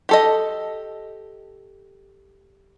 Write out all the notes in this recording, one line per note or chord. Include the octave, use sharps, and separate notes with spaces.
G4 A4 D#5